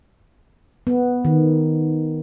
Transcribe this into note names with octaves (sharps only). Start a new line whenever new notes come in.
B3
D#3